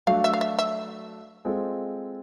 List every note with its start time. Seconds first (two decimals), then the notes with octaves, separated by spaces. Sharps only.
0.07 F#3 A3 D4 F#4 F5
0.24 E5
0.33 F5
0.41 E5
0.59 E5
1.45 G#3 C4 F4 A4